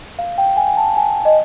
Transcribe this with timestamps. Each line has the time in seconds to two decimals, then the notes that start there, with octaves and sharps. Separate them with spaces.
0.19 F5
0.38 G5
0.57 G#5
0.67 G#5
0.77 A5
0.97 G#5
1.25 D#5